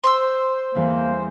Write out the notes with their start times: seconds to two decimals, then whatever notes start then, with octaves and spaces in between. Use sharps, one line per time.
0.04 C5 C6 C#6 E6
0.75 E2 G3 A#3 C4